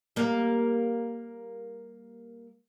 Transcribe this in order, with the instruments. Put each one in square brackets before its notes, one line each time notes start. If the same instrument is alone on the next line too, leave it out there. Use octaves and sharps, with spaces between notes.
[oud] G3 A#3